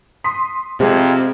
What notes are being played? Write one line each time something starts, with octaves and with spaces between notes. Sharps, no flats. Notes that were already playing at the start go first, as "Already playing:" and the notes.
C6 D#6 B6
F2 C3 G#3